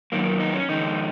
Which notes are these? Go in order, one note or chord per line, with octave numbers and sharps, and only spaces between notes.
F#2 D#3 F#3 A#3
D#4
C#4
F2 D#3 G#3 D#4